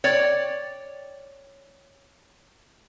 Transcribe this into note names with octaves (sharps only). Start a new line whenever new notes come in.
C#5 D5 G5